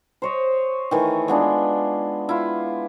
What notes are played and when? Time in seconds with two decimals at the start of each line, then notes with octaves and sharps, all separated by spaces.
0.22 C5 C#5 D#5
0.91 D#3 E3 A3
1.28 G#3 B3 D4 F4
2.29 E4 F4